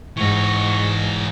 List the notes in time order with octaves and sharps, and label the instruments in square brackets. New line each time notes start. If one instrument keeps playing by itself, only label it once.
[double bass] G#2 [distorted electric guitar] E3 F#4 [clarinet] C#6